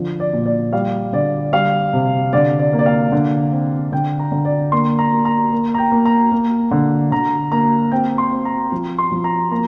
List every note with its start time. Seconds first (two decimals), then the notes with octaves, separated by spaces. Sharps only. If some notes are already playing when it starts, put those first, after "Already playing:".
Already playing: D3 F3
0.20 D5
0.33 A#2
0.46 D5
0.72 G3 F5
1.13 D3 D5
1.53 G3 F5
1.93 C3
2.33 D3 D5
2.59 D5
2.73 A#3
2.79 D5
2.86 F5
3.12 D3
3.52 C4
3.92 D3 G5
4.19 A#5
4.32 D3
4.45 D5
4.72 A#3 C6
4.99 A#5
5.12 A#3
5.25 A#5
5.52 A#3
5.74 A#5
5.78 G5
5.92 A#3
6.05 A#5
6.32 A#3
6.71 D3
7.11 D3 A#5
7.52 A#3 A#5
7.91 C4 G5
8.18 C6
8.31 C4
8.45 A#5
8.72 F3
8.98 C6
9.11 F3
9.24 A#5
9.51 A#3 A#5